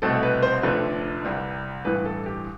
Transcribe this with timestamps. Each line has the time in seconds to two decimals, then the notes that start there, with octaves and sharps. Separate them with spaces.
0.02 C2 B2 A3 C4 A4
0.23 B4
0.42 C5
0.63 F1 F2 D3 A3 B4
1.24 C2 C3 G3
1.85 A1 G2 E3 B4
2.05 A4
2.26 G4